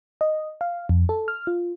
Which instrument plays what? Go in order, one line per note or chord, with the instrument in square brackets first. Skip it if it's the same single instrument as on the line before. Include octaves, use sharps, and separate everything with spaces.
[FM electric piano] D#5
F5
F2
A4
F6
F4